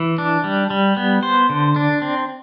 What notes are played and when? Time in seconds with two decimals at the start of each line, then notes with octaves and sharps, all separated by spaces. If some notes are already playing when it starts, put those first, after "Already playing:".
Already playing: E3
0.18 D4
0.44 G3
0.70 G3
0.97 B3
1.23 C5
1.49 D3
1.76 D4
2.02 C4